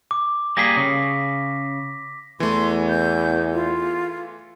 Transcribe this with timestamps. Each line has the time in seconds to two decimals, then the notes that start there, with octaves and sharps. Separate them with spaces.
0.11 D6
0.57 G3 A#3 G#4 A#6 B6
0.77 C#3
2.40 E2 E3 A3 C6
2.89 G6
3.53 F4